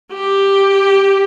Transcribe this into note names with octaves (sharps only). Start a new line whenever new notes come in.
G4